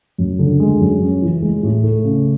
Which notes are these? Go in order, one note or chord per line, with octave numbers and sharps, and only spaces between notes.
F#2
D3
G#3
F#2
C#4
E3
G#3
A2
A3
C#3